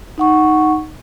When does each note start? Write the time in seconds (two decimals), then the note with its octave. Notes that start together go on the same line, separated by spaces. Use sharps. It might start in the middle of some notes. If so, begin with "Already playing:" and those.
0.18 D#4 F#5 C#6